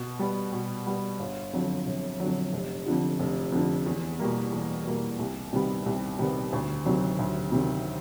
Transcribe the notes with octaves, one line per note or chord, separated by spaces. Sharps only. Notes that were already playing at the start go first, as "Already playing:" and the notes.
Already playing: B2
G3 B3
B2
G3 B3
G1
F2 D3 F#3
G1
F2 D3 F#3
F1
F2 D3 F3
F1
F2 D3 F3
E2
B2 G3 A#3
E2
B2 G3 A#3
C2
C3 D#3 G3 B3
C2
C3 D#3 G3 B3
D2
C3 D#3 F#3
D2
C3 D#3 F#3